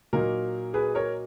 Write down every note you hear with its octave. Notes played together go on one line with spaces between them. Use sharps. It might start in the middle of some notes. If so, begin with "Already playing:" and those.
A#2 F#3 A#3 D#4 A#4
G#4 B4
A#4 C#5